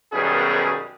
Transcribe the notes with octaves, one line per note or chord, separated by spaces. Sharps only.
B1 F#2 B2 D#3 G3 G#4